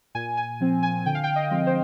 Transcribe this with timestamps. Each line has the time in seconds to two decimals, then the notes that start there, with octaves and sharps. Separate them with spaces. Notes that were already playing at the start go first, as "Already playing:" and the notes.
0.15 A#2 G#5
0.37 G#5
0.60 F3 C4
0.83 G#5
1.06 D3 G5
1.15 F5
1.24 G5
1.36 D#5
1.51 F3 G#3 C4
1.67 C5